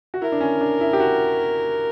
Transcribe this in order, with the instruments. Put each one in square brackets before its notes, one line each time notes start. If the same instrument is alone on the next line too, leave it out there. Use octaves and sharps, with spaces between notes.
[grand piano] F#4
[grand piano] E4 [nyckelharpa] A#4
[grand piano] D4
C#4
D4
E4
G4
F#4